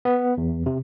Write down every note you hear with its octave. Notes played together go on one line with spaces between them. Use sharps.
B3
E2
C3